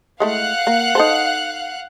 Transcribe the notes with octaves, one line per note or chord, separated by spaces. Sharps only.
G#3 A3 E4 F5 F#5 F#6
A#3
D#4 A4 C5